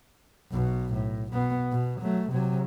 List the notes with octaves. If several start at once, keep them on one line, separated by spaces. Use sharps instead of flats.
B1 B2
A2
B2 B3
B2
F#3 A3
C3 F#3